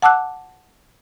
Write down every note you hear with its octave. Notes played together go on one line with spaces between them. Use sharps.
F#5 A5 D6 E6 F#6